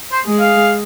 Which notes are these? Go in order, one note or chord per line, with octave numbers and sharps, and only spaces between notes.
C5
G#3 G#4
F5